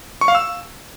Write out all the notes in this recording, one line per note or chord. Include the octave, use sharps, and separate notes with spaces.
C#6
F5
E6